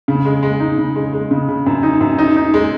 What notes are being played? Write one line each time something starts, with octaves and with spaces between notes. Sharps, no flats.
C#3
G#3
G#3
D#4
C#3
G#3
G#3
C#3
C#3
F#2
D#4
F#2
D#4
D#4
G#3